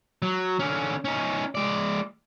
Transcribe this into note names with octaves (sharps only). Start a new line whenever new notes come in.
F#3
D3 C#4
C#4 D#4
G#3 D5